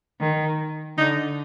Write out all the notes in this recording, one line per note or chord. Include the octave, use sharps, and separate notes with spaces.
D#3
D3 D#4